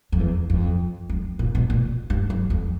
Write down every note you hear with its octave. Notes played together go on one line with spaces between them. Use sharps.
F2
E2
F2
F2
A#2
B2
A#2
G2
F#2
F2